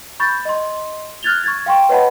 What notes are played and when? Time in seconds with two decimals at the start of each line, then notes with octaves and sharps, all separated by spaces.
0.20 B5 C#6 G6 A6
0.45 D#5 C6
1.23 F6 F#6 G#6 A6 F7 G7
1.44 C#6 G#6 A6
1.66 F5 G5 C6 C#6
1.89 B4 C#5 D#5 F#5 A5 B5